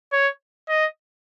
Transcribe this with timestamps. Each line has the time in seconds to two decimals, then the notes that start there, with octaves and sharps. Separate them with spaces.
0.12 C#5
0.68 D#5